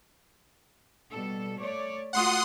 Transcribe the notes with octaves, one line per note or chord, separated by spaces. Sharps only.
B2 G3 A4
A3 C#5 D5
A3 F4 F#4 F#5 C6 D#6